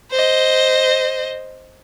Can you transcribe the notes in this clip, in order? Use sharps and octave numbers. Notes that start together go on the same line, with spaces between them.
C5 D#5